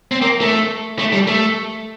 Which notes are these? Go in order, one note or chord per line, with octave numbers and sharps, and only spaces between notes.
C4
A#3
A3
A3
G3
A3